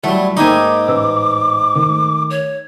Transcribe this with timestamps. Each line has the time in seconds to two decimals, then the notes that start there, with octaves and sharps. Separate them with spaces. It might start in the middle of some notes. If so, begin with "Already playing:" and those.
0.04 F#3 G3 A3 E4 E5
0.37 G#2 A#3 D#4 E5 G5 G#5 B5 D6
0.88 A1 B4 E6
1.75 D#3 A3
2.30 C#5